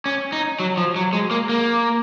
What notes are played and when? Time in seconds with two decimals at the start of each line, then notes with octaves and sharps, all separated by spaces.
0.06 C#4
0.32 D#4
0.60 F#3
0.77 F3
0.96 F#3
1.13 G#3
1.31 A#3
1.49 A#3